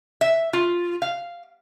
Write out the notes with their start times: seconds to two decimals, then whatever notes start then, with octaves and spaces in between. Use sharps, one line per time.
0.21 E5
0.53 F4
1.02 F5